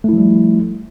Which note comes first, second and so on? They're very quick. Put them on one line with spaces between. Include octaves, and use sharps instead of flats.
A3 E4 F3 G3